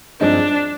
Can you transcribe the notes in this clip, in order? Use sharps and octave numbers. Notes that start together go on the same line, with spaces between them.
G2 F3 G#3 C4 D4 D#4